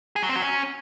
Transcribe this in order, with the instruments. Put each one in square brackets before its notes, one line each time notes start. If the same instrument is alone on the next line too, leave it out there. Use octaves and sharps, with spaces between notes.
[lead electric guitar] G#4
F#3
C4
F#3
C#4